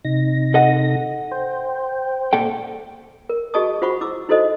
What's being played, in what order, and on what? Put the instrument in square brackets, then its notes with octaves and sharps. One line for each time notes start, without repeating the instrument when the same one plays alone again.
[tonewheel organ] C3 D#4 A#6
[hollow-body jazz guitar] A4 D#5 F#5
[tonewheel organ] C5 G5
[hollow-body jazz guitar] A#2 A4 G5
[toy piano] A#4
F#4 G#4 D#5 A5 C#6 D#6
F4 F#4 C5 F#5 B5 C#6
E4 D6 E6
D#4 E4 F#4 A4 C5 D#5